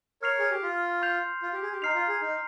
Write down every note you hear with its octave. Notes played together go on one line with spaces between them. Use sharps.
A#4 C#5 F6 C7 F7
G#4
G4
F4
C6 G6 C7 F7
F4
G4
G#4
G4
D#4 A#5 F6 C7 F7
F4
G#4
D#4